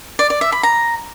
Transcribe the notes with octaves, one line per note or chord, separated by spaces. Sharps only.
D5
D5
E5
B5
A#5